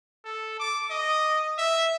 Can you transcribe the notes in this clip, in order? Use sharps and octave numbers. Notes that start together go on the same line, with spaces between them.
A4
D6
D#5
E5